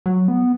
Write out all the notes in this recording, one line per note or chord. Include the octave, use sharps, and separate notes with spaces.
F#3
B3